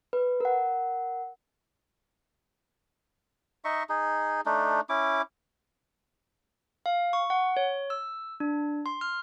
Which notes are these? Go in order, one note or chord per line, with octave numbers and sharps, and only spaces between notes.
B4
A#4 F#5
D#4 D#5 E5 C#6
D#4 G#4
A3 D4 D#4
C#4 E4 D6
F5
C#6
F#5
C#5
E6
D4
C6
F6